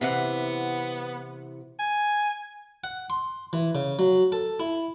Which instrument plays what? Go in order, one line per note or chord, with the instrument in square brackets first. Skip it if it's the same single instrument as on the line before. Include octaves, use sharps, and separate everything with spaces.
[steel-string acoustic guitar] C3 E3 F#5 [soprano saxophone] B3
[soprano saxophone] G#5
[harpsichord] F#5
C6
E3
C#3
F#3
A4
E4